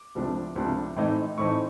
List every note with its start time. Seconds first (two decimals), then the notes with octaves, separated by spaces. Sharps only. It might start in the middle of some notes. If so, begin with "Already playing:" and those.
Already playing: D6
0.15 C#2 C3 F3 A3 D4
0.56 C#2 C3 F3 A3 D4
0.96 A2 E3 A3 C4 D#4
1.37 A2 E3 A3 C4 D#4 C#6